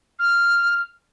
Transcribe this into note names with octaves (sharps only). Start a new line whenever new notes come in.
F6